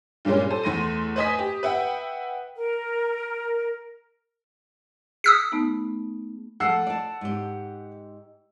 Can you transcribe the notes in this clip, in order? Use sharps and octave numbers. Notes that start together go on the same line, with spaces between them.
G2 A#2 G3 G#3 C#4
A4 C5 D#7
E2 A3 C6 A#6 D#7
B4 C5 D#5 G#5 D#6 B6
G4
B4 E5 F#5 G5
A#4
G#4 D#6 E6 B6
A3 B3 D#4
F3 A3 F#5 E6 C7
D5 A5
G#2 G4